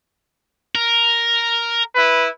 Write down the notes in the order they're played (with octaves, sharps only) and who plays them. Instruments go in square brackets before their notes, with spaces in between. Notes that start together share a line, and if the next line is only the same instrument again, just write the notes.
[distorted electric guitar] A#4
[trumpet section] E4 B4